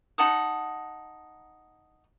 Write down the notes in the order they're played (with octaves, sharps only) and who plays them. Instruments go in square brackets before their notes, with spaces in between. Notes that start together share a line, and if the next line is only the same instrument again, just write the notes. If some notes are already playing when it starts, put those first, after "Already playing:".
[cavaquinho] D#4 F#5 A5 D#6